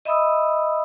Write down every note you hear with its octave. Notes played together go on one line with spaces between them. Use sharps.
D#5 E5 B5 D#6 E6